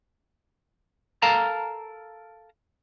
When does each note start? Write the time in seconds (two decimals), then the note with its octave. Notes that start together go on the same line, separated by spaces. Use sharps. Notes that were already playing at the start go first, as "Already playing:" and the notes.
1.22 A4 A#4 F5 A5 A#5